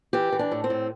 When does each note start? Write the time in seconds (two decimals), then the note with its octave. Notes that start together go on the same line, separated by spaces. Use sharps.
0.13 E3 G4
0.32 E3
0.39 D4
0.51 A2
0.64 C4
0.70 A2